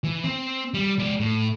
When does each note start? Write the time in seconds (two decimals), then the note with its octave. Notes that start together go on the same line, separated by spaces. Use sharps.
0.04 E3
0.24 C4
0.74 G3
0.99 G#3 D5
1.20 A2